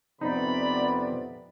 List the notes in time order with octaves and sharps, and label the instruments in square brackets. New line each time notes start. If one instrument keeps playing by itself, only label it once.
[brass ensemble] F2 C3 B3 [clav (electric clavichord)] D#4 [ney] D5 [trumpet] B5